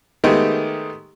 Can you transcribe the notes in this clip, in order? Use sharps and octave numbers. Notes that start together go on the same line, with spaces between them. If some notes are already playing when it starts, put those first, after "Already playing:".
D#3 G#3 A3 B3 D#4 G4